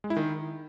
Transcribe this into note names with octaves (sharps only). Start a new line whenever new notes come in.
G#3
E4
D#3